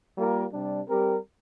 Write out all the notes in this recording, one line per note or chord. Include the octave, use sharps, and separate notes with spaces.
G3 A#3 F4 A#4
C3 G3 D4
G3 C4 G4 A#4